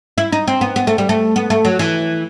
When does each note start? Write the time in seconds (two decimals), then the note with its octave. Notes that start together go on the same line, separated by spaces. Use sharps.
0.18 E4
0.32 D#4
0.48 C4
0.61 B3
0.76 B3
0.87 A3
0.98 G3
1.09 A3
1.36 B3
1.50 A3
1.65 F#3
1.79 E3